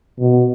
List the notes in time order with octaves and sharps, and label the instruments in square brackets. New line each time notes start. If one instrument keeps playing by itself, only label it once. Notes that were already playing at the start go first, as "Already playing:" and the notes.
[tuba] B2